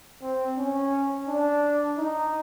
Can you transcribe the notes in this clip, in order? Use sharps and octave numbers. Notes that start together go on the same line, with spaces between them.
C4
C#4
D4
D#4